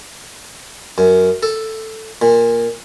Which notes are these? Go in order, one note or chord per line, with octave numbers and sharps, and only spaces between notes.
F#2
A4
A#2